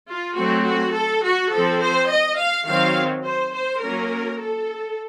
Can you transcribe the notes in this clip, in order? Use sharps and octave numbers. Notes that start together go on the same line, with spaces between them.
F4
F#3 A3 C4 F#4
F#4
A4
F#4
F3 C4 A4
C5
D#5
F5
D#3 F#3 C4 F5
C5
C5
F#3 A#3 C#4 A#4
A4